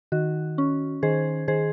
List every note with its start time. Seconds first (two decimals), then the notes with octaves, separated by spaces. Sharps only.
0.12 D#3 F#4
0.58 C#4
1.03 D#3 G#4 C5
1.48 D#3 G#4 C5